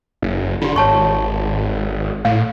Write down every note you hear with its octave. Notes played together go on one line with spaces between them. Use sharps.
F#1
D3 F4 G4
G#1 C#5 A5 C#6
A2 F5